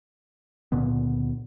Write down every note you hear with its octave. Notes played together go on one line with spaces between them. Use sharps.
C#2 A#2 D3 B3